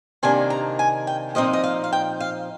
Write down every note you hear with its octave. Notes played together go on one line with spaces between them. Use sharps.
C3 D#3 A#3 D4 G#5
A#5
G#5
G5
A#2 F3 C4 D#4 D#5
D#5
F5
F5
G5
F5